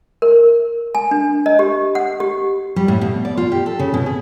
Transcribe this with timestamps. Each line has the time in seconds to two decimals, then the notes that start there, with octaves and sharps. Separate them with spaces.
0.22 A#4
0.95 G#5
1.11 D4
1.46 D#5
1.59 G4
1.95 F#5
2.20 G4
2.76 G3
2.88 A2
3.01 B2
3.25 D5
3.37 F4
3.52 G4
3.66 A4
3.79 C#3
3.94 B2
4.06 G#4